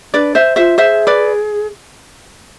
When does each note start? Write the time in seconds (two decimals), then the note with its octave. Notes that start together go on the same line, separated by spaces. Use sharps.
0.13 D4 B4 D5
0.35 C5 E5
0.56 F4 C5 E5
0.78 G#4 C5 E5
1.07 B4 D5